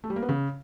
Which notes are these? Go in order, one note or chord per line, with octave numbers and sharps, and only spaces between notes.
A3
G3
A#3
B3
C#3